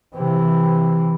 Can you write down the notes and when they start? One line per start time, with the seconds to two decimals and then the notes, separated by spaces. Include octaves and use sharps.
0.15 C3 E3